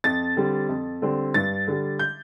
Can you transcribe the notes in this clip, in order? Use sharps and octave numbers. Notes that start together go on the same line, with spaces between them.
F2 A6
D3 G3 C4
F2
D3 G3 C4
G2 A6
D3 G3
G6